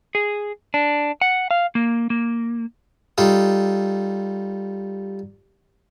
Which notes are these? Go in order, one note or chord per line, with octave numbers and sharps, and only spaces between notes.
G#4
D4
F#5
F5
A#3
A#3
G3 D#4 F4 A4